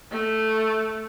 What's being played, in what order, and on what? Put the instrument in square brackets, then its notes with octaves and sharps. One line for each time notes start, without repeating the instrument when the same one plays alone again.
[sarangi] A3